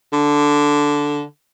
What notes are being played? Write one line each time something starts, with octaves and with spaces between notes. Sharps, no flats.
D3